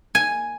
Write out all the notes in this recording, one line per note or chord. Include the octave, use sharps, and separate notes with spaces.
G#5